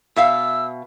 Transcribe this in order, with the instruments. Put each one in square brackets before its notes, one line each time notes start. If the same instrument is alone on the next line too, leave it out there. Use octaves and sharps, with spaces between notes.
[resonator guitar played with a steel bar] B2 E5 F5 [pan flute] E6